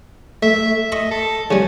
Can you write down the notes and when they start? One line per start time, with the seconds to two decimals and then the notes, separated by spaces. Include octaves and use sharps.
0.43 A3 E5
0.92 D#5 B5 C#6 D#6
1.11 A4
1.51 C#3 G3 C#4